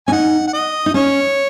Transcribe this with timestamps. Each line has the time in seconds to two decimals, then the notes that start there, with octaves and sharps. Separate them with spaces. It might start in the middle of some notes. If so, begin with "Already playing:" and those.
0.07 C#4 G#5
0.12 D#4 F#5
0.47 F#5
0.53 D#5
0.86 D#4
0.94 C#4 C#5